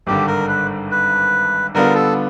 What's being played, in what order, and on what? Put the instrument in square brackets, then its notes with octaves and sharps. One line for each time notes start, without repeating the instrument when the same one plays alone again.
[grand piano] G#1 G2 D3 [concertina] G4
[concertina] A#4
B4
B4
[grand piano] D3 G3 B3 D4 F4 [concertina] A#4
[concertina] A4